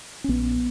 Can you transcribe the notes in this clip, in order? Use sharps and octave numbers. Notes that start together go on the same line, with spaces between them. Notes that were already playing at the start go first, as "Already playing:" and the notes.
C#4
A#1 B3